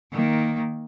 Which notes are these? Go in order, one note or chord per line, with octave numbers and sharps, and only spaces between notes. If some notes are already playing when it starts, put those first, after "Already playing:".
D#3 A#3